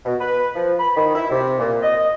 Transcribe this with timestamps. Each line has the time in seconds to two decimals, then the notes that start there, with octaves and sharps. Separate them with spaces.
0.05 B2
0.20 B4
0.55 F3
0.80 B5
0.97 D#3
1.14 E4
1.30 C3
1.59 A#2
1.83 D#5